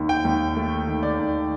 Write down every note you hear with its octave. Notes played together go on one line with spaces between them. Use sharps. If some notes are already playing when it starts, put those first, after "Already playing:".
Already playing: D#2 D#3
G5
D#2
A3
D#3
D5
D#2